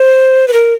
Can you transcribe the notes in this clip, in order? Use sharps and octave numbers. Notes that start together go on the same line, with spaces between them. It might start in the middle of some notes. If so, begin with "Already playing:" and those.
Already playing: C5
B4
A#4